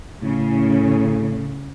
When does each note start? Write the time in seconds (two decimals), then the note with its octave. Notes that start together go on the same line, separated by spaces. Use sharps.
0.22 A2 C#3